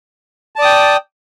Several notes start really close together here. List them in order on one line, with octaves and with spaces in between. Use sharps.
A5 D5 D#6 G5